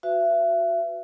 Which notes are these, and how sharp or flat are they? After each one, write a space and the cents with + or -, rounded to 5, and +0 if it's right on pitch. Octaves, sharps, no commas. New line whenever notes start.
F#4 -10 B4 +25 E5 +35